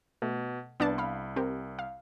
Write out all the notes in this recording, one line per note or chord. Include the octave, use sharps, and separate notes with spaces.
B2 A3
C2 B3 D4 A5
F5 B5
C4 G4 A#4
F5